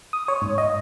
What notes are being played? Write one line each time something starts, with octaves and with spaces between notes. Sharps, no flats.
D#6
C#5
G#2
D#5